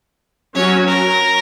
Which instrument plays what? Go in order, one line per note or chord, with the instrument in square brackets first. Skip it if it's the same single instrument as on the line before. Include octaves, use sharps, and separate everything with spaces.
[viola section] F#3 C#4 F#4 [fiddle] C#5
[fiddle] A#4